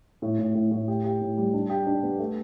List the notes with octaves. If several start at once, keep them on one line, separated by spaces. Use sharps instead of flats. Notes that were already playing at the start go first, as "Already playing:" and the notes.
A2
A2
A2
A2
G4
G4
A2
G3
D4
G4
D4
B3
A3